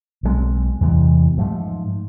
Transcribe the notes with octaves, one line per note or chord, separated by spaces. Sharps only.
B1 B2 G#3 C4
E2 C3 E3 G#3
G#2 F3 A3